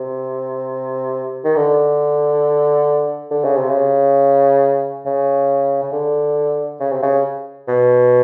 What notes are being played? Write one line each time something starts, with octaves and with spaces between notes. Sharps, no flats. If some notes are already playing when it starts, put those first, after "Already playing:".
Already playing: C3
D#3
D3
D3
C#3
C3
C#3
C#3
C#3
D3
C#3
C3
C#3
B2